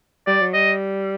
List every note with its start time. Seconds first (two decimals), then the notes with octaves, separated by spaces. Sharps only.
0.27 G3 D5
0.41 F#3
0.54 G3 D#5